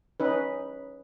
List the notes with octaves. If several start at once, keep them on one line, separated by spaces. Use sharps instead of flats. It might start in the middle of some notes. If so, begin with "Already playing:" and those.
C#4 D#4 B4